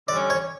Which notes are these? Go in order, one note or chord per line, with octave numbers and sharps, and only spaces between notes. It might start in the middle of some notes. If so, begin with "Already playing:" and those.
D3 G3 C#4 D5
C#5